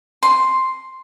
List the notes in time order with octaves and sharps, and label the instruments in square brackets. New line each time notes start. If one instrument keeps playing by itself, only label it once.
[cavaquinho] C6